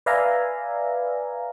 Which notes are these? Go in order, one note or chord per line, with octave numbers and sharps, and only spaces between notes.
B4 D5 E5 F5 G#5 A#5